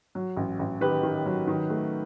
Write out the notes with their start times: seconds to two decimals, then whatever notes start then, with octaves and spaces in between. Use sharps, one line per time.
0.15 F#3
0.37 A1
0.59 A1
0.81 D#3 G4 B4
1.03 D#3
1.26 F#3
1.47 D#3
1.70 A3